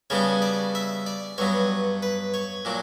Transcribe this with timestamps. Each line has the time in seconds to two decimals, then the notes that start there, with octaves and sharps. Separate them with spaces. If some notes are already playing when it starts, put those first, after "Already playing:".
0.10 C#3 G3 B3 D4 C#5
0.42 D5
0.75 E5
1.06 D5
1.38 G2 F#3 B3 C#5
2.03 B4
2.34 C#5
2.65 A#2 F#3 D4